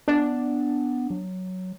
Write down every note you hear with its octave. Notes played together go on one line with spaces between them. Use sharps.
B3 D4
F#3